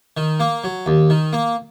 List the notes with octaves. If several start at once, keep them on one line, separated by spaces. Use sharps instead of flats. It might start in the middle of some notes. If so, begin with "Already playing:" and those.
D#3
A#3
F#3
D#2
D#3
A#3